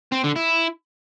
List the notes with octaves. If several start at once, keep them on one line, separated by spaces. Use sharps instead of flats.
C4
D3
E4